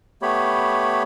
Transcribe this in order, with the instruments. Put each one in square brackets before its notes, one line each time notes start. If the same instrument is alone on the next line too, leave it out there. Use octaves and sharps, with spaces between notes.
[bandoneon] A3 B3 G4 C#5 B5